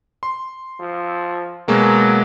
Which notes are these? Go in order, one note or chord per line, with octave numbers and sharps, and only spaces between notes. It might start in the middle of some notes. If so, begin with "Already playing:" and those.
C6
F3
B2 F#3 G#3 A#3